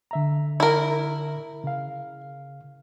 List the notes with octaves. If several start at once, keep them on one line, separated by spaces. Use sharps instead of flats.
D3 E5 A#5
E4 A#4
C#3 F5